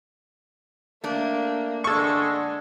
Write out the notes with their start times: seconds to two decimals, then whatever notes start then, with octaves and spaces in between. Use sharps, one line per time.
1.04 A3 A#3 D4
1.84 D3 G#3 A4 C#6